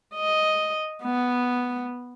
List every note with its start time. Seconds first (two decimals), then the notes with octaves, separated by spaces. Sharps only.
0.15 D#5
1.03 B3